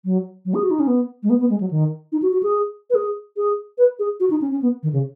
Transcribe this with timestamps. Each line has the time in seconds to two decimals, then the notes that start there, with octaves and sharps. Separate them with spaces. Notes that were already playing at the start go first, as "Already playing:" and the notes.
0.05 F#3
0.45 F#3
0.54 G#4
0.63 F#4
0.71 D#4
0.80 C#4
0.87 B3
1.23 G#3
1.30 B3
1.40 B3
1.50 G#3
1.60 F#3
1.71 D#3
2.12 D#4
2.22 F#4
2.33 F#4
2.43 G#4
2.90 B4
2.95 G#4
3.37 G#4
3.78 B4
3.99 G#4
4.20 F#4
4.30 D#4
4.41 C#4
4.51 C#4
4.62 B3
4.83 D#3
4.93 C#3